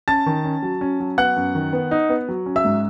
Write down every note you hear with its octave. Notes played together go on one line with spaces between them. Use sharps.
C#4 A5 A6
D#3
C#4
F#3
C#4
F#3
B3 F#5 F#6
F#2
D#3
B3
D#4
B3
F#3
C#4
E5 E6
G#2